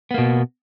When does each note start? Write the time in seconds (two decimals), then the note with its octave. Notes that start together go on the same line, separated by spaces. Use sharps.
0.11 B3
0.14 A#3
0.18 B2